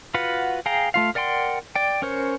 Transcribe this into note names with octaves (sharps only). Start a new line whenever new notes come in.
F4 F#4 B4 F#5
G#4 F5 G5 A#5
A3 F4 F5
A#4 D5 F#5 G5 C6
D5 G5
C#4 A#4 C5 C#5